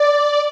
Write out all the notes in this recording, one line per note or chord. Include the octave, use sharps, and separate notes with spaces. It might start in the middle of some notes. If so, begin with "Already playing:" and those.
Already playing: D5